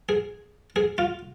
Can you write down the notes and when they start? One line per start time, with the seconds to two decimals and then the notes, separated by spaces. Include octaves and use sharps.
0.09 G#4
0.76 G#4
0.98 F4